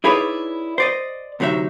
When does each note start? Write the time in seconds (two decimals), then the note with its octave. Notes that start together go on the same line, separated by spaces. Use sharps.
0.04 D#4 E4 G#4 B4 C#5 D5
0.78 C5 D5 D#5
1.40 D2 C3 F#3 D#4 E5